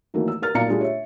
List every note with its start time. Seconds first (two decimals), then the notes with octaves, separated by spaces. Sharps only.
0.14 D#3 E3 F#3 A3 A#3
0.28 E6
0.42 A#4 F6 A6
0.54 B1 A#2 D5 F5 A#5 C#7
0.69 G3 A3 D4 F4 G#4
0.81 C#5 E5